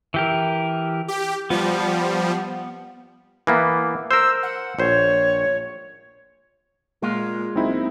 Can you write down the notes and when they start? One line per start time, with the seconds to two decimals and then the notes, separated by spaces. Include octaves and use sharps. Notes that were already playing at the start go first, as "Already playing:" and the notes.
0.14 E3 G4 A#4
1.08 G4
1.50 F3 G3 B3
3.47 E3 A#3 B3
4.11 A#4 C5 E6
4.43 F#5
4.79 A#1 C5 C#5
7.02 A#2 G#3 F4
7.56 F#1 C4 D#4 E4